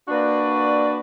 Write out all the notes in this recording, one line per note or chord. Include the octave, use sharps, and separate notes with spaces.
A#3 D4 F#4 B4 D5